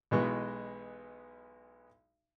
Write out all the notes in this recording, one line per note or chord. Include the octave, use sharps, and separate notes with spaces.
B1 B2 E3 G#3 B3 C#6